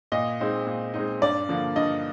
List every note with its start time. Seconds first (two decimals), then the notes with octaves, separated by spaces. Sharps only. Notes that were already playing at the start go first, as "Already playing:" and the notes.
0.12 A#2 D#5
0.40 G#3 C4 D#4
0.67 A#2
0.94 G#3 C4 D#4
1.22 G2 D5
1.49 D3 F3 A#3
1.76 G2 D#5